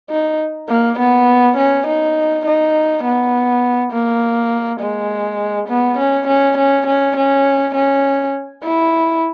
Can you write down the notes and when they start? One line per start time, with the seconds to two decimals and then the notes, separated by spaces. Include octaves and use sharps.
0.10 D#4
0.69 A#3
0.99 B3
1.57 C#4
1.87 D#4
2.46 D#4
3.04 B3
3.93 A#3
4.80 G#3
5.68 B3
5.98 C#4
6.27 C#4
6.58 C#4
6.87 C#4
7.17 C#4
7.75 C#4
8.63 E4